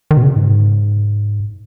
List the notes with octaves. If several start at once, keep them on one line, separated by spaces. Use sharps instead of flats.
D#3
B2
C#3
G#2